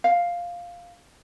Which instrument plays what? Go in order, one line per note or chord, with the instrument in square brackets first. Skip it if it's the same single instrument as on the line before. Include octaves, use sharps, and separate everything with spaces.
[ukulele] F5